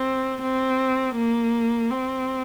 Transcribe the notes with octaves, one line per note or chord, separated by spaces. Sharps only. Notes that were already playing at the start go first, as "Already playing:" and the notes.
Already playing: C4
C4
A#3
C4